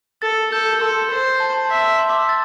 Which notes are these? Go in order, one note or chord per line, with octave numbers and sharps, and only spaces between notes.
A4 A6
A4 G6
A4 C6
C5
A5
C6
E5 A5
C6
D6
E6
A6